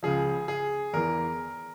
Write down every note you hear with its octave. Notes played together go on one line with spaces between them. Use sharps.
C#2 C#3 F3 G#4
G#4
E2 E3 A#4